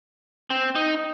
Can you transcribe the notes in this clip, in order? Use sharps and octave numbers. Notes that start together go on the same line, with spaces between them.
C4
D#4